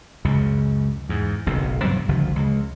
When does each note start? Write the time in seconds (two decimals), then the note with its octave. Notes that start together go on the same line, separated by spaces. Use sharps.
0.25 C#2 F#2 C#3
1.09 E2 G#2
1.47 F#1 B1 C3
1.83 G2 C3 F#3 G3
2.08 F#1 C#2 D3 F3
2.36 C#2